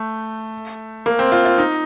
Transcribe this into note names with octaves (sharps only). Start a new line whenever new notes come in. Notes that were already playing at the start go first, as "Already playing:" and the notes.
Already playing: A3
A#3
C4
F4
F4
D#4